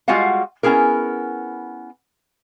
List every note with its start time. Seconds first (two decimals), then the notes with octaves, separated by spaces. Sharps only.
0.08 G3 G#3 F4 F#4 F5 F#5
0.63 B3 C#4 E4 G#4 A#4